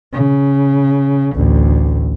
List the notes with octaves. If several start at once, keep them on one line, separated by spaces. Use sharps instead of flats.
C#3
A1 D2